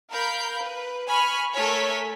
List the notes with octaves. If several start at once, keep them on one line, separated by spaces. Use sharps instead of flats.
A#4 F5 B5 G6
B4
G#5 B5 C#6 F6
A3 A4 A#4 C#5 G#5 B6